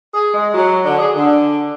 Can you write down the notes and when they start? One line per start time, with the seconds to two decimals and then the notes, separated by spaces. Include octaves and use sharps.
0.13 G#4
0.33 G#3
0.54 F#3
0.85 D3
0.99 G#4
1.14 D3